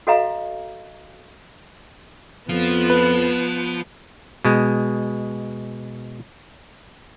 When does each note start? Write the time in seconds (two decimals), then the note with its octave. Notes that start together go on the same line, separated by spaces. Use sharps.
0.07 F#4 A4 D#5 F5 A#5
2.49 F2 F3 B3
2.90 B4
4.45 B2 G#3